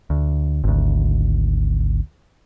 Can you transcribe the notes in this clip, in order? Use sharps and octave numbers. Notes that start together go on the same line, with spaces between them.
D2
G#1 D2